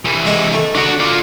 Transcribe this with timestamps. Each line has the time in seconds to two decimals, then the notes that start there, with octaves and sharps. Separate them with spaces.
0.05 C2 E3
0.25 G#3 E4
0.53 A3
0.75 D3 D4 F#4
1.00 F4 D5